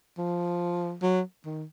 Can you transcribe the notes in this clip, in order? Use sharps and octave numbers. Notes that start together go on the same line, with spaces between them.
F3
F#3
D#3